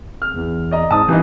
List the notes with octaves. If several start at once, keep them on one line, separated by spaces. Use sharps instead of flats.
F6
E2
D5 D#5 A#5
G#2 A5 D#6
D#1 E3 D#4